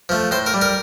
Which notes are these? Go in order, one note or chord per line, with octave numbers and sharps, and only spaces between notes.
F3 A3
A2 C5
A#4
G3
A#4